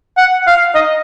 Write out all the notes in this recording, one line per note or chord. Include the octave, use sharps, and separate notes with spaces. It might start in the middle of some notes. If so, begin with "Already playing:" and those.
F#5
F5
D#5